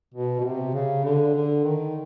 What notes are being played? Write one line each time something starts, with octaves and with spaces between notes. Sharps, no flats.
B2
B2
C3
C#3
D3
D3
D#3